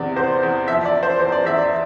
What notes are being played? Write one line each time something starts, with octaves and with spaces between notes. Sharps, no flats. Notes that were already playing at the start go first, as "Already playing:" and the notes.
Already playing: E2 C3 D5
E2 C5
E2
F3 E5
D5
F3
C5
E2 C5
D5
E2 E5
D5